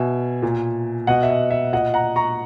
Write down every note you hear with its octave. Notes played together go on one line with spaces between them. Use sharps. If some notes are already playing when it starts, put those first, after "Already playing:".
Already playing: B2 E5 G#5
A#2
B2 D#5 F#5
E5
D#5
E5
A#2 D#5 F#5
F#5 A#5
A#5 C#6